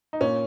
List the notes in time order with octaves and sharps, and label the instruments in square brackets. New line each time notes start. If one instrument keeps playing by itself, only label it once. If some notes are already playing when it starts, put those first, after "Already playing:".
[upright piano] D#4
A#2 C#4